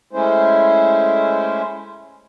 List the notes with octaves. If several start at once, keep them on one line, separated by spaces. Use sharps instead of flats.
G#3 A3 C#4 E4 C5